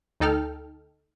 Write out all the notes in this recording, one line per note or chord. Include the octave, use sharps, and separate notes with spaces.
D2 D#4 A4 G5 F6